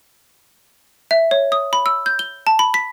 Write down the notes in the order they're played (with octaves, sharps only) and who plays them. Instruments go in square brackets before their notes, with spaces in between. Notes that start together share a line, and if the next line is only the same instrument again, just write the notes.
[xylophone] E5
C#5
D#6
B5
E6
G6
G7
A5
B5
B6